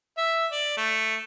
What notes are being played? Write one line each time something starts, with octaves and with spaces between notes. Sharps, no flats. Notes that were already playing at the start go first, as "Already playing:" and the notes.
E5
D5
A3